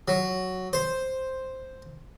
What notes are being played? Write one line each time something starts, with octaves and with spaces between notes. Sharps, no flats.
F#3
C5